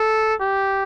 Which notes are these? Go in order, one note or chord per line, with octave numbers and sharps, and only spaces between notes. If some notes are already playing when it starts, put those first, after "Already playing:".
Already playing: A4
G4